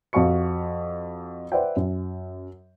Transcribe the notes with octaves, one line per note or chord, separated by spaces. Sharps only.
F2 F#4 F5 C#6 C#7
B4 C5 D5 E5 F#5 G5
F#2